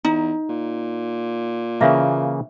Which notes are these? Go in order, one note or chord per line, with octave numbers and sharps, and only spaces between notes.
E2 D#4 A#5
A#2
C#3 E3 A#3 E5 F5